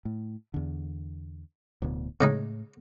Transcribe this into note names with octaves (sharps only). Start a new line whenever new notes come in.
A2
E2 D3
D1 D2 B2
A2 C#3 G#3 D#4